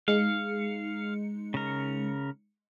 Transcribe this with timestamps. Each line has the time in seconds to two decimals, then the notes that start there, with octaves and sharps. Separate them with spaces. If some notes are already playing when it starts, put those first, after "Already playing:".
0.08 G#3 D#4 F5 C#7
1.54 C#3 A#4